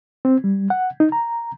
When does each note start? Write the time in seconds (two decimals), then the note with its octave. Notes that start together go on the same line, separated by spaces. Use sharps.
0.25 C4
0.44 G3
0.70 F#5
1.00 D#4
1.12 A#5